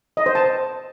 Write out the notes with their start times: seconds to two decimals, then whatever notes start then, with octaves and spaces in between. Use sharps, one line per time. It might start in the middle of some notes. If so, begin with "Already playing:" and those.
0.17 D#5
0.26 C5
0.35 A5